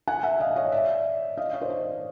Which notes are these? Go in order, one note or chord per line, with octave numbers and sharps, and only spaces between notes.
F#5 G#5
E5 F#5
D#5 F5
C#5 D#5
D5 E5
D#5 F5
C#5 D#5
C5 D5
C#5 D#5